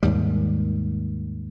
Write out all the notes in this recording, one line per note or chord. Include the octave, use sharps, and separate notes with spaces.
D#2 G#2 G3